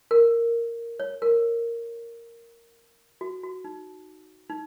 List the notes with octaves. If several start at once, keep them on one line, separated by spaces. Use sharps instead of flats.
A#4
C#5
A#4
F#4
F#4
D#4
D#4